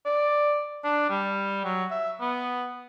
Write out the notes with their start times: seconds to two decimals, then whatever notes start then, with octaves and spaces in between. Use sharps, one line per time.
0.05 D5
0.84 D4
1.10 G3
1.65 F#3
1.91 E5
2.21 B3